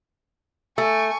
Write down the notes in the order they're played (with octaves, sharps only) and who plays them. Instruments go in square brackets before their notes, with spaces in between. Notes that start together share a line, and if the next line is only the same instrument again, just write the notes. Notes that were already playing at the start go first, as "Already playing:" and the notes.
[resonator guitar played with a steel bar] A3 [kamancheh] G#5 C#6